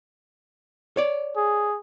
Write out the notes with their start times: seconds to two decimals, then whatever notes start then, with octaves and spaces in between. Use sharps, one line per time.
0.97 C#5 D5
1.36 G#4